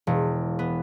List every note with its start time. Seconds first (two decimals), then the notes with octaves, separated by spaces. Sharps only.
0.07 E1
0.59 B3